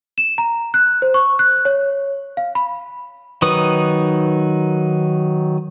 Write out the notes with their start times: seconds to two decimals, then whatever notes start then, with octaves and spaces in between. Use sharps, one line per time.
0.18 E7
0.38 A#5
0.74 F#6
1.02 C5
1.14 C#6
1.39 F#6
1.65 C#5
2.37 F5
2.55 B5
3.42 D#3 F#3 D#4 B4 D#6